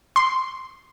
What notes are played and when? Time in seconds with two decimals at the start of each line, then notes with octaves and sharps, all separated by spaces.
0.16 C6